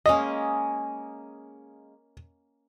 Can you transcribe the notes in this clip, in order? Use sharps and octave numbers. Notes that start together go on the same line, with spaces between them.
G#3 A#3 C#4 D#5